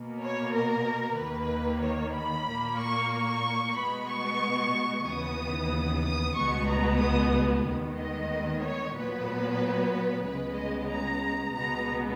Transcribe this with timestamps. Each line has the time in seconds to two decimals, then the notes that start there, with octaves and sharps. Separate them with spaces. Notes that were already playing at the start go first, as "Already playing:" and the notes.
Already playing: B2 A#3
0.22 C#5
0.54 A#4
1.19 D#2 D#3 A#3 B4
1.84 C#5
2.16 B5
2.48 A#2 A#3
2.80 C#6
3.13 C#6
3.78 B2 G#3 B3 B5
4.11 C#6
5.07 D#2 C#3 E3 B3 D#6
6.05 D#6
6.37 C#2 B2 G#3 B3 C#6
6.69 A#5
7.01 D#6
7.66 D#2 D#3 G#3 B3
7.98 D#5
8.63 C#5
8.95 A#2 F#3 B3 B4
10.25 C#2 C#3 G#3 B3 B4
10.57 D#5
10.90 A#5
11.54 C#2 B2 G#3 B3 A#5